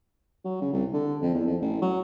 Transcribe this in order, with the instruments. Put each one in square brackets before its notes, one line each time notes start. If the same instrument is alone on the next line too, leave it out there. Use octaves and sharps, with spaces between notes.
[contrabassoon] F#3
C#3
C2
D3
F2
E2
F2
A1
F#3